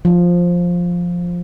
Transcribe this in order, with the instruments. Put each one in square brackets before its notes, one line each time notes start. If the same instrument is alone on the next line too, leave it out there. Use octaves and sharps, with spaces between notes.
[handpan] F3